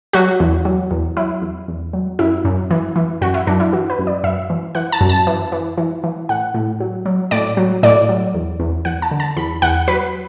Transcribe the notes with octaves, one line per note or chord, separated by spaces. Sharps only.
F#3 F#4
E2
F#3
E2
F#3 E4
E2
E2
F#3
F#2 E4
F#2
E3
E3
F#2 F#4
E4
F#2 D4
E4
E3 F#4
B4
F#2
D5
F#2 E5
E3
E3 F#5
A5
F#2
A5
E3
E3
E3
E3
A2 F#5
A2
F#3
F#3
A2 D5
F#3
A2 D5
F#3
E2
E2
E2 F#5
A5
D3
A5
E2 B5
E2 F#5
F#3 B4